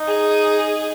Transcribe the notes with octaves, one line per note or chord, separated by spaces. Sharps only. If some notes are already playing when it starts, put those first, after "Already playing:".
Already playing: D#4
G#4